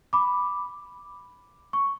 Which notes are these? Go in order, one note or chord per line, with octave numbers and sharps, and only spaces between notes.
B5 D6
C#6